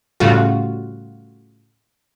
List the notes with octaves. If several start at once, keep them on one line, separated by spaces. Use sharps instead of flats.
A2 C#3 G3 F4 F#4